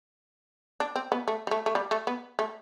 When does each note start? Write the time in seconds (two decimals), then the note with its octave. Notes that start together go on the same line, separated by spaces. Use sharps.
0.80 D4
0.96 C4
1.12 B3
1.28 A3
1.47 G3
1.51 A3
1.66 A3
1.75 G3
1.91 A3
2.07 B3
2.39 A3